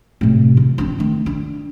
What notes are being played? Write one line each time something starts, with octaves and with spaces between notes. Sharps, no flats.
A2 C3
E3
C4 D4
D#3 A3
D4